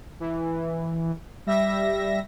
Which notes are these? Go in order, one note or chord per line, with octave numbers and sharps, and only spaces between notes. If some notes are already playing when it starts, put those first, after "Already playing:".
E3
G3 E5 A#6